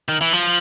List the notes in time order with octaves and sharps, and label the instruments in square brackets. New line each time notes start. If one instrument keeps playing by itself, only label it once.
[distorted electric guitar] D#3
E3
F3